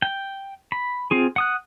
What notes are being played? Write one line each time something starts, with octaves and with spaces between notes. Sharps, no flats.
G5
B5
C4 F4 G#4
F#5 D#6 F#6